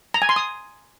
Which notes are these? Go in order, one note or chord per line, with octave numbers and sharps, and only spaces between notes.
A#5
G#5
C6
D#6